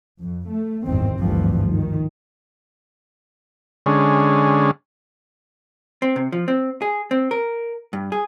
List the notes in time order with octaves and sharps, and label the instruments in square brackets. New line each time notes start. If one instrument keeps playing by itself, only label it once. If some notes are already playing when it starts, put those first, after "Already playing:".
[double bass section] F2
A3
G#1 E2 G2 D#3 C4
G#1 D2 G2 E3 F3 G3
D#3
[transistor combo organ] D3 G#3 C#4
[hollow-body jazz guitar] C4
C3
F3
C4
G#4
C4
A#4
G2
G#4